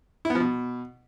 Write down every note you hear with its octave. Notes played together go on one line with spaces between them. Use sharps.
E4
B3
F3
B2